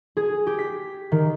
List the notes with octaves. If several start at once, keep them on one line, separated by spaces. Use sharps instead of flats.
G#4
G4
B6
D#3